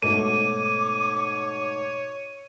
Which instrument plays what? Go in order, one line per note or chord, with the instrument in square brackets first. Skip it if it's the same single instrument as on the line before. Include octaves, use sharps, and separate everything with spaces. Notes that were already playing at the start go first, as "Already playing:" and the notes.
[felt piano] G#2 B2 A3 [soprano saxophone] C#5 [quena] D6 [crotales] D#7